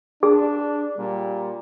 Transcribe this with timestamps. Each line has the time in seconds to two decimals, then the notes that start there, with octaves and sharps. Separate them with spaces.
0.23 D4 G#4
0.97 A#2 G3